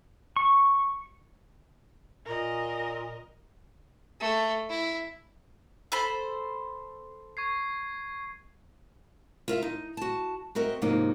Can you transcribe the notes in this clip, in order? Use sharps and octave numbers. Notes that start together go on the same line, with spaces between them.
C#6
A#2 A#4 D#5
A3
E4
A4 C5 B5
C#6 G#6 C7
F4 A#4 E5 F5
D#4
F#4 A5
C4 F#4 A#4 D#5 E5
G#2 C3 F3 F#3 A#3 D#4